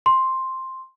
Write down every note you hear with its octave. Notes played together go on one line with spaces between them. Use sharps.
C6